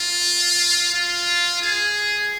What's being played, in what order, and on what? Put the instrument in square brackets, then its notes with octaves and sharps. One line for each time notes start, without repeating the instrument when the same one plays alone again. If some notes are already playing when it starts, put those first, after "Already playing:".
Already playing: [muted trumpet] F4
F4
G#4